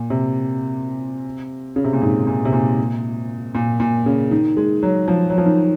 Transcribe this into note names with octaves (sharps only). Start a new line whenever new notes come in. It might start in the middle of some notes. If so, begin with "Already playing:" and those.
Already playing: A#2
C3
C#3
C3
A#2
G#2
A#2
C3
A#2
A#2
A#2
C#3
D#3
G#3
F#3
F3
F#3
F3
D#3